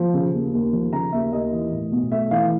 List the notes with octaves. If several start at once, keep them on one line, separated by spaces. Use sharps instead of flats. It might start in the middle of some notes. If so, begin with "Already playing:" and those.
Already playing: F3
C#3
D#2
D#2
F3
C#3 A#5
D#2 E5
D#2 D#5
E3
A2
B1
A3 E5
E3 F5